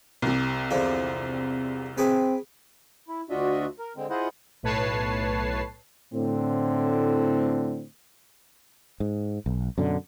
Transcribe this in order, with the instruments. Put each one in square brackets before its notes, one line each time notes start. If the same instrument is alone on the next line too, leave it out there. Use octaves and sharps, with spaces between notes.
[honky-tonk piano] C2 C3
[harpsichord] E2 D3 F3
[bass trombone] C4 [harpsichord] G#4 B4 D6
[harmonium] E4
D2 D4 F4 F#4 D#5 E5
A#4
D3 G#3 C4
E4 F4 G#4 C5 D#5 F#5
[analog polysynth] B1 A2 B4 C#5 A5 C7
[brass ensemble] A2 D3 C4
[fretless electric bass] G#2
B1
F#2 B2 D3